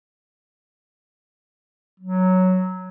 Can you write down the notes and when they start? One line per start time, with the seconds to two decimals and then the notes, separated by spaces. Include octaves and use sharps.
2.00 F#3